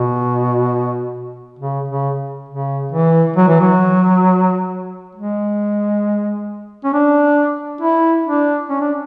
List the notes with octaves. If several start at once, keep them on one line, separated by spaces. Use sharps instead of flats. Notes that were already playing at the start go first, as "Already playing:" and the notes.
Already playing: B2
C#3
C#3
C#3
E3
F#3
E3
F#3
G#3
C#4
D4
E4
D4
C#4
D4